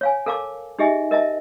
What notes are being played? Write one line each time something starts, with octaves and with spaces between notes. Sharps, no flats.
C#5 F5 G#5
A4 A#4 F5 A5 D6
D#4 G4 G#4 D#5 E5 G#5
A#4 D#5 E5 A5